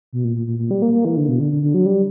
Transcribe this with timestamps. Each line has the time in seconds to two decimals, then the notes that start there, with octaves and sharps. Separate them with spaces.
0.13 B2
0.24 A#2
0.36 A#2
0.47 A#2
0.59 A#2
0.71 G3
0.82 A#3
0.93 A#3
1.05 E3
1.17 D3
1.28 B2
1.40 D3
1.51 D3
1.62 D3
1.74 F#3
1.86 G3